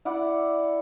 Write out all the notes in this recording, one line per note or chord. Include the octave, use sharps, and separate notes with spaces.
E4 D5 F#5